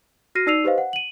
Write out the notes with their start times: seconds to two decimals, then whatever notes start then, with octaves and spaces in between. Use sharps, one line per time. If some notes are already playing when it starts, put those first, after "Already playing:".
0.35 F#4 F6 A#6 C7 D#7
0.47 D#4 D5 E6 C7 D#7 F7
0.64 G4 B4 C5 D#5 F5
0.78 F#5
0.93 D#7 F#7